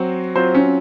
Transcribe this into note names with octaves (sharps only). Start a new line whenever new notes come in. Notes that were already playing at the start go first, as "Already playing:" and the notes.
Already playing: F#3 C4 F#4 C5
F#3 C4 F4 C5
C#4